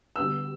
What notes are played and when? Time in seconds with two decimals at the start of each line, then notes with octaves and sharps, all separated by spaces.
0.16 D3 G3 B3 F#4 B4 E6